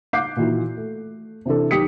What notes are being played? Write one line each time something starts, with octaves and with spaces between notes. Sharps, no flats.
F5 D6 F#6 G6 C7
A#2 D#3 E3 F#4
A3
C3 E3 D4 A4
B1 D#3 G4 D#6 B6 C#7